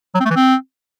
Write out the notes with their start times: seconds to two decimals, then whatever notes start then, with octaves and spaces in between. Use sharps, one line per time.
0.15 F#3
0.20 C4
0.25 A3
0.31 E3
0.36 C4